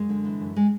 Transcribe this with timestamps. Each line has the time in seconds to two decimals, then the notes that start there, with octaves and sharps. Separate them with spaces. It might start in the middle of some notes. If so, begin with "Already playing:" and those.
Already playing: F#2 G#3
0.09 D3
0.25 E3
0.40 F#2
0.56 G#3